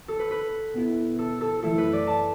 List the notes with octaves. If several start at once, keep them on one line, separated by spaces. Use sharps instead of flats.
A4
B4
B4
B2 B3 E4
A4
A4
F#2 E3 A3 E4 A4
B4
D5
A5